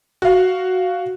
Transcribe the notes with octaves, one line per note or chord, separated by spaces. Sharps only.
F#4 F5